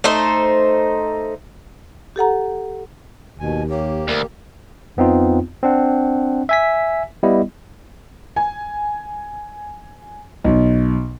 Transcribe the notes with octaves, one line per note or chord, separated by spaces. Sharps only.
A3 D#4 C5
G4 A4 F#5 A#5
D#2 B2 G#5
A#3 G4 C#5
D2 A#4
F2 B3 C4 D#4 F4
C4 D4 F#5
E5 G#5 B6
G3 B3 E4 D#5
G#5
B1